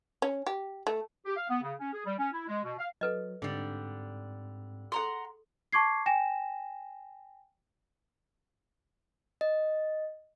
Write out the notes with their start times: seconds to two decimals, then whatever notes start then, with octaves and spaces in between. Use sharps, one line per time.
0.22 C#4
0.47 G4
0.87 A3
1.25 G4
1.37 F5
1.49 B3
1.62 C#3
1.80 C#4
1.94 G#4
2.06 G3
2.18 C#4
2.32 E4
2.48 G#3
2.63 B2
2.79 F5
3.01 F#3 A4 B4 D#5
3.42 G#2 D3 G3 C4
4.92 G#4 A4 F#5 A#5 C6
5.73 A5 C#6 D6 G#6 C7
6.06 G5 G#5 A#6 E7
9.41 D#5